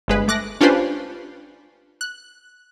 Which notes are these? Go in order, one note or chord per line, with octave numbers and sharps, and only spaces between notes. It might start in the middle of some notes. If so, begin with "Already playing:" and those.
G1 G#3 B4
A3 D6 F#6 A#6
C#4 D4 F4 G4 B4 C5
F#6